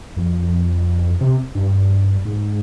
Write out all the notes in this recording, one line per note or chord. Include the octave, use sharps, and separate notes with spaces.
F2
C3
G2
G#2